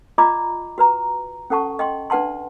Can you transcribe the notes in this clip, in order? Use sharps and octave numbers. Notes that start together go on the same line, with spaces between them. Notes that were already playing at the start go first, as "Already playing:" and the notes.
F4 D5 D#5 A#5 B5 D6
F#4 B4 A#5
C#4 A4 F#5 A5 C#6
D#5 G5 C6
D4 B4 F#5 A5 C6